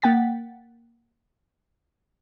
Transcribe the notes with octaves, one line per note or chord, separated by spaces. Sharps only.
A#3 F#5 G5 A6 B6